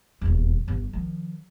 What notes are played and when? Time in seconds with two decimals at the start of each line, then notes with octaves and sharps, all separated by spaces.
0.21 D#1 E2
0.68 G1 G2
0.93 D#3 F3